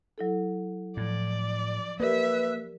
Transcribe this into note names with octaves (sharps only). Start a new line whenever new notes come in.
F#3 E4 A4
A2 F3 D5
A#3 G4 A#4 B4 D5 E5